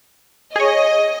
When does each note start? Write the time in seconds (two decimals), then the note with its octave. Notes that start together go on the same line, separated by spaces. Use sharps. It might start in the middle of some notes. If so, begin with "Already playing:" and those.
0.56 G#4 C#5 D#5